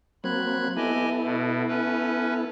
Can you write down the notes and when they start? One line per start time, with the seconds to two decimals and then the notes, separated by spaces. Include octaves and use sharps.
0.24 F#3 A#3 C4 B5 F#6 G#6
0.77 B3 E4 G4 A4 D#5 G#5
1.23 B2
1.68 C#4 B4